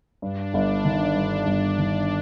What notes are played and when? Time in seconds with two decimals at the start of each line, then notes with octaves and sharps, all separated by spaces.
0.22 G2 D4
0.54 G1
0.85 D#3
1.15 G2
1.47 G1
1.78 D#3